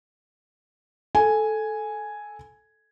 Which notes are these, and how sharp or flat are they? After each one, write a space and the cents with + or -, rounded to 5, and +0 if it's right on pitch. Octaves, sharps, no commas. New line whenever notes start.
A4 -10 G#5 +0